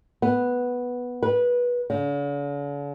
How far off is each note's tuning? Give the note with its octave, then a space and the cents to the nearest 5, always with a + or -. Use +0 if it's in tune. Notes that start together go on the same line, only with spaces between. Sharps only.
B3 -5
B4 -20
D3 -45